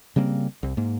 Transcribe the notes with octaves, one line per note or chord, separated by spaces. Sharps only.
C#3 G3 A#3 C4
C2
G#2 A#3